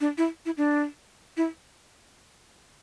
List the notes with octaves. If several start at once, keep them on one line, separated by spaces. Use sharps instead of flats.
D4
E4
E4
D4
E4